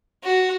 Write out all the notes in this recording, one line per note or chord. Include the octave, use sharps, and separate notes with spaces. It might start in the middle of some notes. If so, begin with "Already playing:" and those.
F#4